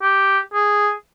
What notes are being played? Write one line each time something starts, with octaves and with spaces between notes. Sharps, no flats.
G4
G#4